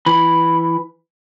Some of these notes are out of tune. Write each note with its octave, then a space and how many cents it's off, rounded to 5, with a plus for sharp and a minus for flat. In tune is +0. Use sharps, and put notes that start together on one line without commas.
E3 +10 B5 +0